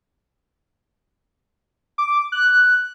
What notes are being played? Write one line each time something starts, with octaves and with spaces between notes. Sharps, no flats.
D6
F#6